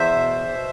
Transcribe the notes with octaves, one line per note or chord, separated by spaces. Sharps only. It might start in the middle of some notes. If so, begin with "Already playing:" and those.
Already playing: E2 C5 E5
B2
B2